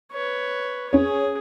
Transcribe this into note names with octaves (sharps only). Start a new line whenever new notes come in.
B4 C#5
C#4 G#4 C#5